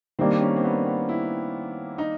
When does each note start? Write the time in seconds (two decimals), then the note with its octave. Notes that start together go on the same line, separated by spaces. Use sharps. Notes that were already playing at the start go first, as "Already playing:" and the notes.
0.19 D#3 G3 A#3 C4 D4
0.41 C#4
0.56 C4
0.64 B3
0.86 B3
1.09 E4
1.98 D#4